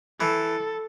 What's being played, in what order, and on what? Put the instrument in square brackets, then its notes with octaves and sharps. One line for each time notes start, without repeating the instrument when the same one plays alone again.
[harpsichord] E3 [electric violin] A4